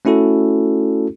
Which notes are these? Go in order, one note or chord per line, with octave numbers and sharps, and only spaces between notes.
A3 C#4 E4 F#4 A4